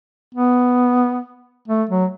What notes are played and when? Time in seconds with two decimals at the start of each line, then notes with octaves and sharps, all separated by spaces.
0.34 B3
1.68 A3
1.89 F#3